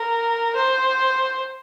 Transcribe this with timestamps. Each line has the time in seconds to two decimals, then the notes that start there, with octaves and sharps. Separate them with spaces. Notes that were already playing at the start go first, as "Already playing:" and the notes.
Already playing: A#4
0.55 C5